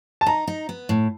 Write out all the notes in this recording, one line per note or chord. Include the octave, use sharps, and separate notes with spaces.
A5
D#4 A#5
D#4
B3
A2